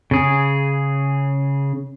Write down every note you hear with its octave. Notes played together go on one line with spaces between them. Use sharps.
C#3 G#4